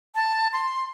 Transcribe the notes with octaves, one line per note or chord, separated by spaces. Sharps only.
A5
C6